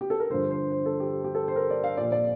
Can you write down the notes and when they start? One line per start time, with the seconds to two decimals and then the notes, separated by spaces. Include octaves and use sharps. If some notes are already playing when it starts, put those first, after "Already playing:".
0.01 G4
0.10 A4
0.20 A#4
0.30 G2 D3 F3 C5
0.51 C5
0.72 C5
0.86 A4
1.00 G4
1.24 G4
1.35 A4
1.48 C5
1.56 A#4
1.70 D5
1.84 F5
1.97 A#2 F3 D5
2.12 D5